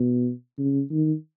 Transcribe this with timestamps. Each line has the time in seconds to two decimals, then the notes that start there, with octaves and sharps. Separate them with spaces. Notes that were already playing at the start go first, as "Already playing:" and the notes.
Already playing: B2
0.59 C#3
0.91 D#3